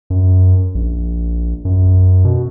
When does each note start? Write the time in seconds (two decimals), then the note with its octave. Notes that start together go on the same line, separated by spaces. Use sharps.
0.10 F#2
0.75 A#1
1.65 F#2
2.25 B2